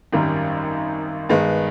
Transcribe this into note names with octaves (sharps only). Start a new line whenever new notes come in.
G#1 F#2 D#3 G3
G2 D#3 G#3 B3